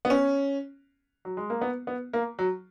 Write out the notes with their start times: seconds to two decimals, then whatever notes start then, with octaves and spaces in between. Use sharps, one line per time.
0.05 B3
0.10 C#4
1.25 F#3
1.37 G#3
1.50 A#3
1.61 B3
1.87 B3
2.13 A#3
2.39 F#3